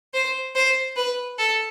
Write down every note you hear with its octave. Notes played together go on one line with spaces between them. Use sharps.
C5
C5
B4
A4